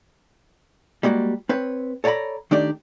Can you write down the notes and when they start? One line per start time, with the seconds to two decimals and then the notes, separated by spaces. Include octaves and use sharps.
1.03 G3 G#3 A#3 F#4
1.49 C4 B4 C#5
2.04 A4 C#5 D5 F#5 A#5 B5
2.51 D#3 A3 D4 D#4 G4 D5